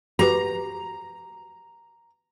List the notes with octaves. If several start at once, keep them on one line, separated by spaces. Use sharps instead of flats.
F#4 G4 B4 A#5